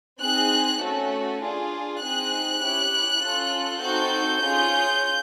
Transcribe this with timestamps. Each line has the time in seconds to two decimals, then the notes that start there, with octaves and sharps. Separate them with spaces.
0.21 C4 D#4 G#4 F#6
0.81 A3 C#4 F#4 A4
1.41 D4 F4 G#4
2.01 C4 D#4 G#4 F#6
2.61 C#4 E4 G4
3.22 C#4 F4 A4
3.81 C4 D#4 F#4 A4 G6
4.42 C#4 F4 G#4